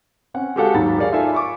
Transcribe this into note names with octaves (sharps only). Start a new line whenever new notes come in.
C4 C#4 F#5
G#3 F#4 G4 A4 F5 F#5
D#2 G#2 F#3 B5 A6
G4 G#4 A#4 C#5 D5 F5
D#4 F4 A4 D5 E5 G#5
B5 C#6 D6